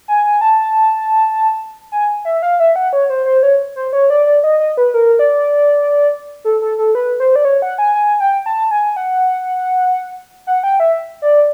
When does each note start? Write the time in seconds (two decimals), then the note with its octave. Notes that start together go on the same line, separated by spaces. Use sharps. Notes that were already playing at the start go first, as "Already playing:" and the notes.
0.08 G#5
0.24 G#5
0.41 A5
1.92 G#5
2.25 E5
2.42 F5
2.60 E5
2.76 F#5
2.93 C#5
3.10 C5
3.26 C5
3.43 C#5
3.76 C5
3.93 C#5
4.10 D5
4.27 D5
4.44 D#5
4.60 D#5
4.77 B4
4.94 A#4
5.19 D5
6.45 A4
6.62 A4
6.78 A4
6.95 B4
7.20 C5
7.36 D5
7.45 C#5
7.62 F#5
7.78 G#5
7.95 G#5
8.20 G5
8.46 A5
8.71 G#5
8.97 F#5
10.47 F#5
10.64 G5
10.80 E5
11.22 D5